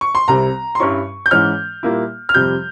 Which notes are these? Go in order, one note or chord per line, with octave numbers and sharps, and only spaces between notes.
C#6
C6
C2 C3 G3 C4 A#5
C6
G2 G3 C#4 E4 C#6
G6
G#2 E3 G#3 C#4 F6
A#2 G3 A#3 E4
F6
F2 C3 G3 G6